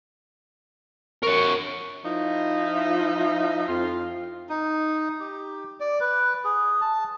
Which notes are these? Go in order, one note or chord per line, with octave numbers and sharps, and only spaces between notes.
A#4 C#5 C#6
F3 D#4 E4
F2 F4
D#4
G4
D5
B4
G#4
A5